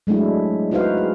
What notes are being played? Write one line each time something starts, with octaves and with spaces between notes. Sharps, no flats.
F#3 G#3 A3 D4 E4
D#4 E4 F#4 B4 C5 F5
G#4